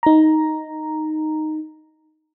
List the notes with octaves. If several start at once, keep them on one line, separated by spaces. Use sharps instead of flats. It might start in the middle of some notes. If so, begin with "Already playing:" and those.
D#4 A#5